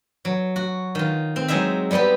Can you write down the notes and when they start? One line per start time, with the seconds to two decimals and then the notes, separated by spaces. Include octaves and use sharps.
0.25 F#3
0.56 F#4
0.95 D#3 F4
1.36 C4
1.48 F#3 G#3 D#4 C5 E5
1.91 G3 G#3 B3 C4 G4